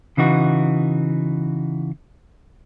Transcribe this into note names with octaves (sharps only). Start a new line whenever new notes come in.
C#3 E3 D#4 F#4